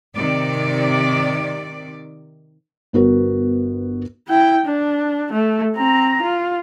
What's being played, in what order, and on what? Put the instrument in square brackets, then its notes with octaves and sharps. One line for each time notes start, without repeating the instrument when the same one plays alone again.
[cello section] C3 D#3 D5
[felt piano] G1 B3 F#4 A#4
[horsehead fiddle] E4 G5
D4
A3
C4 A#5
F4